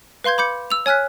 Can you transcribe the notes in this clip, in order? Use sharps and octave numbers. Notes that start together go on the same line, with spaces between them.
B4 F5 C6 G6 G#6
B5 D6 G6 C#7
E6 F7
C#5 G#5 F6 F#6 B6